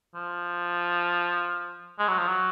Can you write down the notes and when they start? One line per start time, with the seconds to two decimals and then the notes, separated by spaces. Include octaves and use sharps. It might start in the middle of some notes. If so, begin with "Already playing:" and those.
0.15 F3
1.99 G#3
2.08 F#3
2.18 F3
2.28 F#3